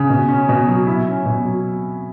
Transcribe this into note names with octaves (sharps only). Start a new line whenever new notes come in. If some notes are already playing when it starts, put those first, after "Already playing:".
Already playing: C#3
B2
C#4
B2
F#3
E4
C#4
B2
F#3